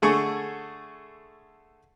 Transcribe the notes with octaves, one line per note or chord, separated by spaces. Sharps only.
D3 A3 G#4 C#6